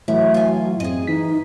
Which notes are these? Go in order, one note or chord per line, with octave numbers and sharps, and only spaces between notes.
A2 E3 F#3 E4
F4 G#5
F#2 C4 G#4 D#5
E3 D#4 B6